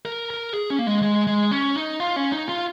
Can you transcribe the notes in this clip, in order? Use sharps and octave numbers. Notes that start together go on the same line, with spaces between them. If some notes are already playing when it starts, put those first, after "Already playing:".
A#4
A#4
G#4
C#4
A#3
G#3
G#3
G#3
C#4
D#4
F4
C#4
D#4
F4